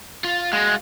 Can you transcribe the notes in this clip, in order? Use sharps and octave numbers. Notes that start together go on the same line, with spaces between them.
F4
G#3 F#4 F5